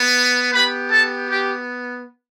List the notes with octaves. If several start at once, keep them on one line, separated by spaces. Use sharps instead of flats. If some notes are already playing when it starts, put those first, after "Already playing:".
Already playing: B3
B3 G4 B4 B5
A4 A5
G4